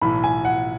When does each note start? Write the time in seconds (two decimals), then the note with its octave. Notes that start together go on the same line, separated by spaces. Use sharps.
0.02 B1 A2 E3 B5
0.24 G#5
0.45 F#5